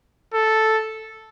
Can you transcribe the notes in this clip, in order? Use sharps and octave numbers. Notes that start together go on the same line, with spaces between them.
A4